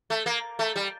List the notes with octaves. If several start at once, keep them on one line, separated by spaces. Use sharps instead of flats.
A3
A#3
A3
G3